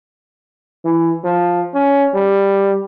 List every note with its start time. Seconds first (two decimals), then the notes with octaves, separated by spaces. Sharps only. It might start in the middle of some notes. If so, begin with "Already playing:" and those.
0.85 E3
1.24 F3
1.74 C#4
2.14 G3